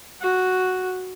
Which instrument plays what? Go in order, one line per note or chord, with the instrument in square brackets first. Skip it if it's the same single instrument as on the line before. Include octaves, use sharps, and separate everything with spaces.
[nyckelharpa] F#4